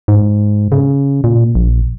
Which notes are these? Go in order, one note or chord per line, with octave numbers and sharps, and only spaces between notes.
G#2
C#3
A#2
A#1